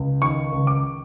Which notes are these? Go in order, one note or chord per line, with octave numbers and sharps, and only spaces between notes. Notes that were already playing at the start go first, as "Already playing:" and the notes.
Already playing: C#2
D#3 C#6
C#2
D6